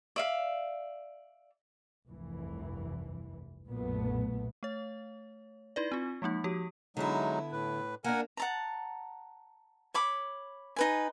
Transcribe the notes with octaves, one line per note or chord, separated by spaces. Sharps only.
D5 E5 F5
F1 C2 G2 E3
B1 F#2 A#2 A3 B3
A3 C#5
D#4 E4 B4 D5
C4 F4
F3 G#3 A#3 D#4
F3 F#4 G4
D3 F#3 G#3 B3 D#4 E4
A2 B4
A#3 D4 A#4 F#5 G#5
F#5 A5 A#5
C#5 B5 D6
D#4 B4 G#5